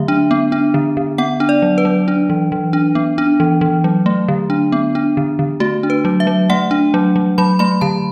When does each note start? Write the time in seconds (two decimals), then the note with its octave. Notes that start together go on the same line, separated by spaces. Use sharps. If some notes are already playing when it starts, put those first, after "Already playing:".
Already playing: D3 F#3 A3 E5
0.08 D4
0.31 B3
0.52 D4
0.74 D3
0.97 D3
1.18 B3 F#5
1.40 D4
1.49 D5
1.62 F#3
1.78 B4
1.85 F#3
2.08 D4
2.30 E3
2.52 E3
2.73 D4
2.95 B3
3.18 D4
3.40 E3
3.61 E3
3.84 F#3
4.06 A3
4.28 D3
4.50 D4
4.72 B3
4.95 D4
5.17 D3
5.39 D3
5.60 A3 F#4
5.83 D4
5.90 B4
6.05 F#3
6.20 E5
6.27 F#3
6.50 A3 F#5
6.71 D4
6.94 F#3
7.16 F#3
7.38 F#3 B5
7.59 A3 B5
7.81 D3 A5